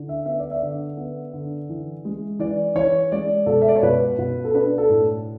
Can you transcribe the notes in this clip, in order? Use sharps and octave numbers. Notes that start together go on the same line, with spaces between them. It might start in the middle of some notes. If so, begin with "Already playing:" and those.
Already playing: D3 E4
E5
B3 E5
D5
E5
D3
B3
D3
E3
G#3
E3 D5
E3 C#5
G#3 D5
B2 A4
E5
D5
C#5
B2 B4
B2
A4
D4 B4
A4
A2